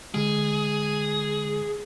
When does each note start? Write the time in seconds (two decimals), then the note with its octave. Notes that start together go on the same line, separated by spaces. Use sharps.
0.14 D3 G#3 G#4